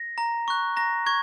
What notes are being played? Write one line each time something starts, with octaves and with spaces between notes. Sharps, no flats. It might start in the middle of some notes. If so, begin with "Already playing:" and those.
Already playing: A#6
A#5
C#6 F#6
A#5 A#6
C#6 G#6